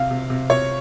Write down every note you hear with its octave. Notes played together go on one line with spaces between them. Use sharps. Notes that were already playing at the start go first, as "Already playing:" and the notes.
Already playing: C3 F5
C3
C3
C3 C#5